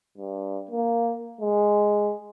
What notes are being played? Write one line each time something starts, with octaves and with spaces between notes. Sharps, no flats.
G2
A#3
G#3